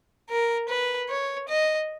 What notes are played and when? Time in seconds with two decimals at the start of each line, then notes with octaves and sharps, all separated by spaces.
0.29 A#4
0.69 B4
1.09 C#5
1.48 D#5